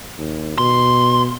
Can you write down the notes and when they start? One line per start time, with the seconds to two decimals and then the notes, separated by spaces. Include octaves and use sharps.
0.18 D#2
0.58 B2 C6